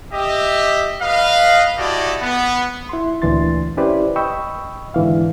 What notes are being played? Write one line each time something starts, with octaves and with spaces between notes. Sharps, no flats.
G4 D#5 E5
B4 D#5 F5
E4 F#4 G4 A4 D5 D#5
B3
E4 C6
D2 A#2 E3 D4 C6 A6
C#4 E4 G4 B4 C5 D5
D#5 G5 B5 C#6 E6
G#2 D3 E3 F5